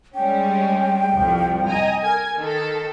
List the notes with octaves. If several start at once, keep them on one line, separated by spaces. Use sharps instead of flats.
G3 G#3 C#4 G5
C2 F2 F3
D#5 G#5 A#5
A#4 G#5 G#6
D#3 A4